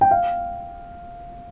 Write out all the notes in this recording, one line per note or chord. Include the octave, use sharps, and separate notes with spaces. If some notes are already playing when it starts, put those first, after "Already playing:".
G5
F5